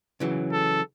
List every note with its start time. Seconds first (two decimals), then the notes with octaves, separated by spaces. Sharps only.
0.20 C#3 E3 F#3
0.53 A4